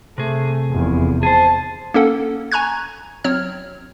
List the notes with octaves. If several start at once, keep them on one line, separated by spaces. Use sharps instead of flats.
C3 A3 G#4
F1 E2
G#4 C5 A5
A#3 C#4 A4 F#5
G#5 A#5 C#6 F#6 G#6
F#3 C4 C#5 F6